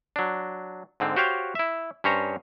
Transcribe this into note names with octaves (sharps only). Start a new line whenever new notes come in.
F#3 D4
G#2 D3 C4
F#4 G4 C5 C#5 F5 G5
E4 E5
G2 C#4 C5 C#5 A#5